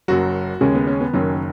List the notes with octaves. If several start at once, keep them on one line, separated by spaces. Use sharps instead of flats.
F#1 F#2 F#3 F#4
D#2 C#3 G#3 C#4
B3
C#4
B3
F#1 F#2 D#3 F#3 C#4